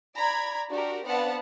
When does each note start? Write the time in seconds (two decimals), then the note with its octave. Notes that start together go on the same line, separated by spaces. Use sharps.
0.17 D5 A#5 B5 G#6
0.70 D4 F#4 G4 A#4
1.05 B3 C4 D4 F5 F#5 A5